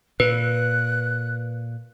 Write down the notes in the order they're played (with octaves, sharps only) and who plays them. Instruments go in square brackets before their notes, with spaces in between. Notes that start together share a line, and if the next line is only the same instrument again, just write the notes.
[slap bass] A#2 [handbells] B4 [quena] F#6